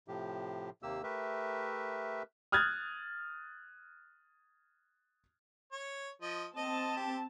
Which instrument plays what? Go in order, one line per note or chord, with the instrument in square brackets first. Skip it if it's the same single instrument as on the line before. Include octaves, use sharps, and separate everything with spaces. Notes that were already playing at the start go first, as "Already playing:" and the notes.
[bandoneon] A2 C3 F3 G4
D#2 C3 A#3 G4 E6
A3 G4 A#4 B4 E5
[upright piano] D#6 F6 F#6 G#6 A6
[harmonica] C#5
F3 D#5
[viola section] C4 A5 [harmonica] D#5
[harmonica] G4